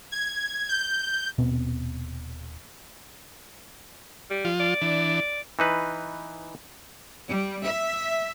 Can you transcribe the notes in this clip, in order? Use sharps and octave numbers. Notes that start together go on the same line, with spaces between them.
G#6
G6
D#1 B2 B3 C4
G3
F3 F4
D5
E3 D4
E3 D#4 B4
G3
E5